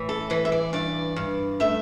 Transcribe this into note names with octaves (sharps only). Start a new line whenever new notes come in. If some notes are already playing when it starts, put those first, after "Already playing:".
Already playing: A2 E3
A4
E3 B4
E5
D5
G2 D5
G2
A3 E5